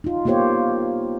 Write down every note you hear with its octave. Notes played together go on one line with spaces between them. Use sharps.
D#4 F4
A#3 B3 F4 G4 C5 C#5